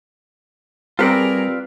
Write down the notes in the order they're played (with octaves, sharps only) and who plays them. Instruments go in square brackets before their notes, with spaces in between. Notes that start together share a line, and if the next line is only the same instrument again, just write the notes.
[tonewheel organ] G3 [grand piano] C4 [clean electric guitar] F4 B4 D5 [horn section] G#4 A#4